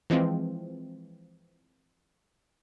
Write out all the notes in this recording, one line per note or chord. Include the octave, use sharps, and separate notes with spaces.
E3 F3 G#3 C4 F4